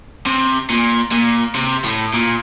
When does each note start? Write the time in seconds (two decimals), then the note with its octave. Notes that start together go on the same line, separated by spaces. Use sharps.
0.26 C3
0.70 A#2
1.12 A#2
1.55 C3
1.84 A2
2.13 A#2